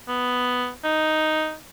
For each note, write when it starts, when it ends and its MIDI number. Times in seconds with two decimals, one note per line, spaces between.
0.08 0.69 59
0.84 1.54 63